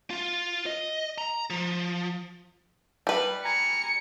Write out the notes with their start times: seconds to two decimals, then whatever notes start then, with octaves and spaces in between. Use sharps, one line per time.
0.11 F4
0.66 D#5
1.18 A#5
1.50 F3
3.07 G3 B4
3.45 G#5 A#5 C#7